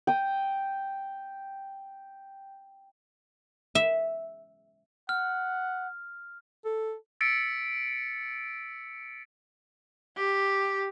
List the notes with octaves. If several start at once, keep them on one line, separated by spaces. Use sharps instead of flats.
G5 D#6
E5
F#5 F6
A4
E6 A6 B6 C#7 D7
G4